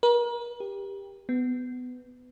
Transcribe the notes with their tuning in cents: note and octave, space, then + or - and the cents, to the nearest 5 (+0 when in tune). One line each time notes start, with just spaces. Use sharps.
A#4 +40
G4 +15
B3 +20